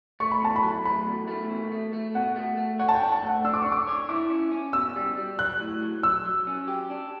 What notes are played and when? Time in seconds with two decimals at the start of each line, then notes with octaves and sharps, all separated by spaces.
0.20 A3 C#6
0.32 B5
0.42 E2 A5
0.56 B5
0.63 F#3
0.85 A3 B5
1.06 E2
1.28 A3
1.50 B2
1.72 A3
1.93 A3
2.15 B2 F#5
2.36 A3
2.57 A3
2.79 C#5 F#5
2.89 A5
2.95 G5
3.02 D4
3.12 A5
3.23 A3
3.29 F#5
3.44 D4 E6
3.54 D6
3.62 D4 C#6
3.72 D6
3.87 C#5
4.09 E4 D6
4.30 C#4
4.52 C#4
4.73 B2 E6
4.96 G3
5.17 G3
5.39 F#3 F#6
5.60 A2
5.82 F#3
6.03 F#3 E6
6.26 F#3
6.47 C#4
6.68 G4
6.90 D4